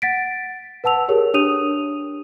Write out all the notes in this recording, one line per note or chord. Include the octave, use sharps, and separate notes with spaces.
F#5 A6 B6 D7
B4 F#5 A5 E6 F7
G4 G#4 A#4 C#5
D4 G4 C#5 D#6 D#7 F7